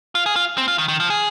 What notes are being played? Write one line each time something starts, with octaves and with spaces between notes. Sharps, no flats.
F4
G#4
F4
C4
F4
D#3
D#3
F3
G#4